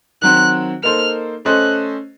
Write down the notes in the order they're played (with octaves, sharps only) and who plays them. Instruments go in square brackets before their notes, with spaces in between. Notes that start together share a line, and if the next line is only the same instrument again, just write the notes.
[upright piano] D#3 F#3 C4 [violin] F#6
[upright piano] A#3 D#4 A4 C5 [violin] F6
[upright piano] A3 C#4 A4 C5 D#5 [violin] F#6